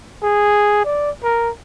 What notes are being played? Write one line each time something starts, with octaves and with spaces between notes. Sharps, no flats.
G#4
D5
A#4